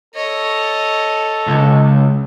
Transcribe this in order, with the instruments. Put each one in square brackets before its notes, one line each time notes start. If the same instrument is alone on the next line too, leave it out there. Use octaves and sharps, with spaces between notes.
[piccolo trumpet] A4 [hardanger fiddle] C#5 D#5
[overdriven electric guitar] C#2